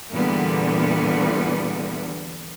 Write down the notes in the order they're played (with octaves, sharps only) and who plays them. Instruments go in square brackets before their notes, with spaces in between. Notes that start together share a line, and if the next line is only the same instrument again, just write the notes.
[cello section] E2 A#2 D3 G3 B3